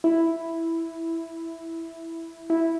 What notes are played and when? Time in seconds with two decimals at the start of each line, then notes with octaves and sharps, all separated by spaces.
0.04 E4
2.50 E4